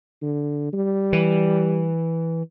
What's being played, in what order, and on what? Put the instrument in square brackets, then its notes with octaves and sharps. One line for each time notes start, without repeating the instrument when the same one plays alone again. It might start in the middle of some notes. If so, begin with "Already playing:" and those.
[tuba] D3
G3
[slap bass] E3